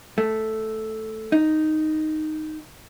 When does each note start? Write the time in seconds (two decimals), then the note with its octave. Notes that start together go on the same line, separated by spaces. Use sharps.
0.18 A3
1.32 D#4